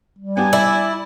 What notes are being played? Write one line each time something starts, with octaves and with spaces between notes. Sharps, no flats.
G3
B3 D4 G4 G#5
E4 D5